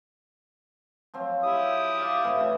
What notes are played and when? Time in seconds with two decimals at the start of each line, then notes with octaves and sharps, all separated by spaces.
1.14 F3 F#3 C4
1.43 E4 G4 E5 D#6
1.99 D5 F5 A5
2.24 A2 E3 C4
2.40 C#3 E3 F4